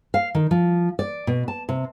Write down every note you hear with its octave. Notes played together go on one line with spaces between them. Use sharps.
F5
D#3
F3
D5
B2
A5
C3